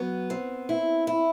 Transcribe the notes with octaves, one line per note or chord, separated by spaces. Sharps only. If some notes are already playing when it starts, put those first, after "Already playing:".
Already playing: F#3 B3
C4
E4
E4